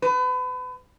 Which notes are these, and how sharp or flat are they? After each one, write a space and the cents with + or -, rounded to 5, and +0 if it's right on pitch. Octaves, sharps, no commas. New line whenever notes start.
B4 +35